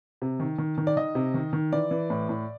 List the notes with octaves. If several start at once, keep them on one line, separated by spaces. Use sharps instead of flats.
C3
D#3
D#3
D#3
D5
D#3 D#5
C3
D#3
D#3
E3 D5
E3
A2
A2